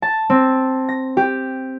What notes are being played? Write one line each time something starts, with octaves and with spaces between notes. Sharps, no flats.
A5
C4
A#6
G4